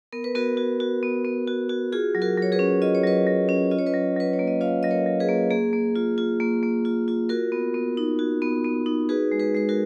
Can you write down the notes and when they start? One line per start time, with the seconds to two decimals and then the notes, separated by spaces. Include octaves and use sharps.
0.13 B3 A#4
0.24 B4
0.35 B3 F#4 A#4
0.57 F#4
0.80 F#4
1.03 B3
1.25 B3
1.48 F#4
1.69 F#4
1.92 F4 G#4
2.15 F#3
2.22 F#4 A#4
2.37 F#3
2.42 C#5
2.52 G#4 B4
2.59 C#4
2.82 F4 D#5
2.95 C#5
3.04 F#3 B4 D#5
3.27 F#3
3.49 C#4
3.71 F4 D#5
3.79 C#5
3.86 B4 D#5
3.94 F#3
4.16 F#3 B4
4.33 C#5
4.39 A#3
4.47 D#5
4.61 F4 C#5 F5
4.83 F#3 D#5
4.91 A#4 C#5
5.06 F#3
5.20 G#4 B4
5.29 A#3
5.51 A#3 G#4
5.73 A#3
5.96 F4
6.18 F4
6.40 A#3
6.63 A#3
6.85 F4
7.08 F4
7.29 F#4 A#4
7.52 B3
7.74 B3
7.97 D#4
8.19 F#4
8.42 B3
8.64 B3
8.86 D#4
9.09 F#4 G#4 B4
9.32 G#3
9.39 G#4 B4
9.55 G#3 B4
9.69 F#4 A#4